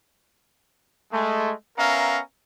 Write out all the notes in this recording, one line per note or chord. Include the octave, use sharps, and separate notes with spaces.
G#3 A3
B3 C#4 A#4 E5 F5 A#5